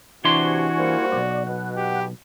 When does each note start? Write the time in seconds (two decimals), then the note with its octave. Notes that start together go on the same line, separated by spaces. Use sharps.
0.24 C3 E3 D4 E4 F#4 G#5 C6 C#6
0.78 G3 A#3 C5
1.12 B1 G2 D5
1.47 B2 F#5
1.77 G4